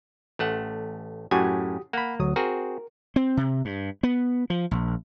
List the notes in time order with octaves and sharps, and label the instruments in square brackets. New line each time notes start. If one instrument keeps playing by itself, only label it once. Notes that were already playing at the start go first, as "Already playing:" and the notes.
[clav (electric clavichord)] A1 A3 F#5
[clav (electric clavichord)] F#2 A2 G#5 [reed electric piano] F#4 G4 D#6
[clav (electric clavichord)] A#3 [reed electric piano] F#5 B5
[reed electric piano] D2 F#3 D#6
[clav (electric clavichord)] C4 F#4 G#4 [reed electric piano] A#4
[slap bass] C4
C3
G2
B3
F3
A#1